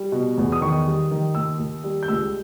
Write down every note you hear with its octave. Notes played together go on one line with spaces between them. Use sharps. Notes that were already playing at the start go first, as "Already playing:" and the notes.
Already playing: G3
B2
E2
D#6
D#3 C#6
G3
D#3
D#2 E6
D#2
G3
G6
C#2 E6